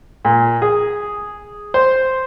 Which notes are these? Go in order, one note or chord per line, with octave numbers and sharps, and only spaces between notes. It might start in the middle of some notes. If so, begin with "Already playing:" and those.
A#2
G#4
C5